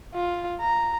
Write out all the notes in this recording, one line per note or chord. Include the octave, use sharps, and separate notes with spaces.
F4
A#5